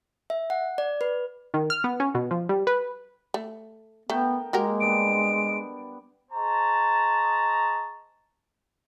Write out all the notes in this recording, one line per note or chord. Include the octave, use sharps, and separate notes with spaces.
E5
F#5
D5
B4
D#3
F6
B3
C#4
B2
F3
G3
B4
A3
A3 B3 A#4 G5 A5
G#3 A#3 F#4 G4 A#4
G3 B3 D4 D7
G#4 C5 D#5 A5 A#5 C#6